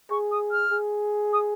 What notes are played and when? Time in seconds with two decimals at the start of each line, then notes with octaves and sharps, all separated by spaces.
0.11 G#4 C#6
0.32 D#6
0.52 F6
0.72 G#4
1.33 D#6